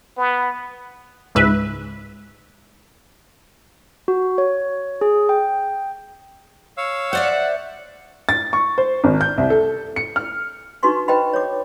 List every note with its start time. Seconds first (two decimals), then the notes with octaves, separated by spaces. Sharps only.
0.17 B3
1.35 C#2 G#2 B4 E5
4.08 F#4
4.38 C#5
5.01 G#4
5.29 G5
6.77 C#5 F5 E6
7.13 C5 D5 E5 F#5
8.29 A6
8.53 C#6
8.78 C5
9.04 G#1
9.21 G6
9.38 C2
9.50 A4
9.96 C#7
10.16 F6
10.83 D4 D#4 F#4 B4 C6 C#6
11.08 B4 C5 D#5 G5 A#5 B5
11.34 C#5 D6